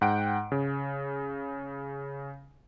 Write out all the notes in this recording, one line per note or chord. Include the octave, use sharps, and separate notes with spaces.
G#2 F#5 G5 D7
C#3